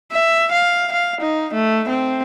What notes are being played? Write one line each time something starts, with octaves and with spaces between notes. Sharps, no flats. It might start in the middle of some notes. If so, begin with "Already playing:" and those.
E5
F5
F5
D#4
A3
C4